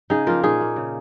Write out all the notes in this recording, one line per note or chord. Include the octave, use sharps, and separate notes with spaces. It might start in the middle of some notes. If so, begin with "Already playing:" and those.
C#3 D#4 G#4
F3 A#3 F4 A#4
A#2 D#4 G#4
A#3
C#3